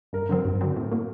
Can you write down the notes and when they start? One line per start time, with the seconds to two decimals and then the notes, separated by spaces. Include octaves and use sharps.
0.13 G2 A#4
0.29 D3 F#3 C4
0.45 G2
0.61 D3 F#3 C4
0.76 A2
0.92 F#3 A#3